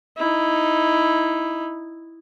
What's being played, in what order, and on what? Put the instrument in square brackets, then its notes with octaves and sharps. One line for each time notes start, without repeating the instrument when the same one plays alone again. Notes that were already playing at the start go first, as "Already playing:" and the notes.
[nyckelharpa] D#4 E4